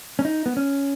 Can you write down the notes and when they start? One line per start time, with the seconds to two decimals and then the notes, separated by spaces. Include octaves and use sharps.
0.19 C#4
0.25 D#4
0.46 B3
0.57 C#4